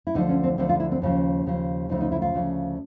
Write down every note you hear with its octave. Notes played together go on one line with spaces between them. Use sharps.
E4
D2 D3 F3 D#4
C#4
C4
D2 D3 F3 C4
F4
E4
C4
D#2 C#3 F3
D#2 C#3 F3
D2 C#3 F3 D#4
D#4
E4
F4
D2 C#3 F3